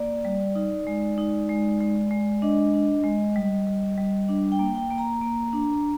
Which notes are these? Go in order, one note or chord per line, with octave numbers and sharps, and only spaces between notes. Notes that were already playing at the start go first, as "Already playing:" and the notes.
Already playing: A#3 D5
G3
D#4
G#3
D#4
G#3
G#3
G#3
D4 D#5
D4
G#3
G3
G3
G3
D4
G5
A#3
G5
A#3
A#5
A#3
D4